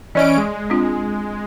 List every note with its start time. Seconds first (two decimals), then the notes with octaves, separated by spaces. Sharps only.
0.15 E3 C#4 D5 D#5 D7
0.37 G#3
0.70 C4 D4 F4